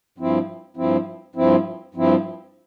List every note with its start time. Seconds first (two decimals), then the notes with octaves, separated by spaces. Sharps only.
0.18 G2 F3 C4 E4
0.76 G2 F3 C4 E4
1.35 G2 F3 C4 E4
1.94 G2 F3 C4 E4